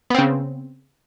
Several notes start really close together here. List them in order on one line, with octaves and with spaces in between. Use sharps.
B3 C4 C#3